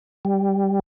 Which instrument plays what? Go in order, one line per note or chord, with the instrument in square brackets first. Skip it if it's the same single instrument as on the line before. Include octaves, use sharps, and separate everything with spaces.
[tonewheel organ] G3